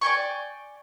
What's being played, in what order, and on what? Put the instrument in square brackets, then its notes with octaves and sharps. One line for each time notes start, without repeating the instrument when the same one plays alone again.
[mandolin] D5 G5 G#5 C#6